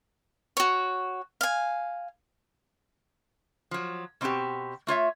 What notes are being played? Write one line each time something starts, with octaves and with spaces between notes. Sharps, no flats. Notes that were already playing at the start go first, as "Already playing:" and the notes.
F#4 C#5
F5 G#5
F3 F#3
B2 C4 E4 F#4 G4
A3 F4 C#5 E5